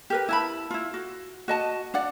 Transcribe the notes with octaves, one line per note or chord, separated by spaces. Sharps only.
G4 A#4 B4
E4 A5 B5
E4 F4
F#4
F#4 D#5 A5
D4 D5 F#5